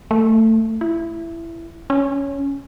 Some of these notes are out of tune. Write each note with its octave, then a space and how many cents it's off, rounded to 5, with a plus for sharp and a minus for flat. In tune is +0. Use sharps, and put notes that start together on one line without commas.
A3 +20
E4 +15
C#4 +10